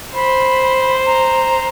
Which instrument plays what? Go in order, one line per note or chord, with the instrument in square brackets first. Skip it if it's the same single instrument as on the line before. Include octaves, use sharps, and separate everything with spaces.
[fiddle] C5 [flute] B5
[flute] A#5